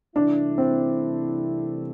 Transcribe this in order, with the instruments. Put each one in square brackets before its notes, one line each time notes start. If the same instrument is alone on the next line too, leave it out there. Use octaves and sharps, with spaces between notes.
[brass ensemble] C2 C3 E3 A3 E4 [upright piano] D4
[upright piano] C4